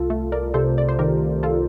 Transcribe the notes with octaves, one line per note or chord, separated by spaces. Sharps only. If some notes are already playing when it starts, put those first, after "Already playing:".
Already playing: C2 F4 A4
A3
A#4 D5
C3 A4 C5
D5
C5
D#3 G4 A#4
F4 A4